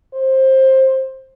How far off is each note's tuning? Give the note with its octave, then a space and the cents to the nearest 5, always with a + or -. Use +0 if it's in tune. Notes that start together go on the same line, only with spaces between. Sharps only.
C5 +20